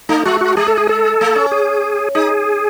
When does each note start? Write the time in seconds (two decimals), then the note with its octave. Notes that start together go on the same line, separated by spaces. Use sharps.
0.09 A3 D#4
0.25 G#3 F#4
0.41 F#4
0.57 G#3 G#4
0.68 A4
0.78 G#4
0.89 A4
1.21 A3
1.36 C#4
1.51 G#4
2.15 D#4 G#4